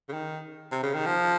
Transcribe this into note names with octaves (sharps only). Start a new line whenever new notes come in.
C#3
D#3
C3
C#3
D#3
F3